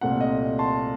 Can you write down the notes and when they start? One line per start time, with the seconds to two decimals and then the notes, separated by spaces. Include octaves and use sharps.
0.01 C2 A#2 A3 C4 F#5
0.21 D#5
0.59 A5 C6